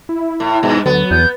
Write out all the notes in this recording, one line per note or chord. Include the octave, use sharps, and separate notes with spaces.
E4
A2
G2 B2
D2 F#3 B3
E2 G6